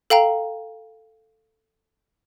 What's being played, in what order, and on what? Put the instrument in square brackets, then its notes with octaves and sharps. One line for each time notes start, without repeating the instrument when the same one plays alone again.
[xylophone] A4 F5 G5 A#5